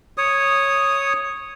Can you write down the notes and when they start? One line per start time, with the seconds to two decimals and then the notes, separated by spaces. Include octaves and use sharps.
0.18 C#5 D#6